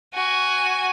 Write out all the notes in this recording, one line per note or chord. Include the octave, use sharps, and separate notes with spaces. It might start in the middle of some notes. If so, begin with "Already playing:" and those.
F#4 G#5